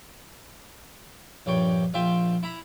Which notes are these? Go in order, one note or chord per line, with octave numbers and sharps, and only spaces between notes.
A#1 G2 C#5 G5
A#1 F4 E5 G5 C6
E4 A#5 B5